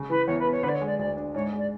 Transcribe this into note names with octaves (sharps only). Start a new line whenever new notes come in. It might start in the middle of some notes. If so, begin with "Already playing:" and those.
Already playing: C#3
E3 B4
E2 C#5
B4
B3
C#5
D3 B4
D5
C#5
G#3
D5
D2 D5
D4
G#2 C#5
G#3
D5